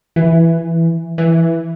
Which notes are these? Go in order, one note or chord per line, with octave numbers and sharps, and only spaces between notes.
E3
E3